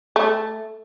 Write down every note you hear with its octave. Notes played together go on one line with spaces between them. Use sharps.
A3